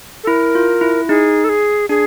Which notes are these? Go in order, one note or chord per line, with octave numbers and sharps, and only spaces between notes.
A4
E4 A#4
F4
E4
D#4 G#4
A4
G#4
D4 G#4